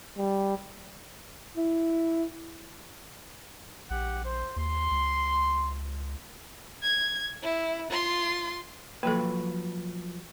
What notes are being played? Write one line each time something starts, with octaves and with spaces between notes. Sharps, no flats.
G3
E4
A#1 G4 F#5
C5
D#2 C6
C#2
G#6
E4
F4 C6
F3 F#3 A#3 A4 B4